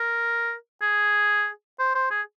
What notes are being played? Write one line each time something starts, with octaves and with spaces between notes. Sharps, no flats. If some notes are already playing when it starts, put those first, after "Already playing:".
Already playing: A#4
G#4
C5
C5
G#4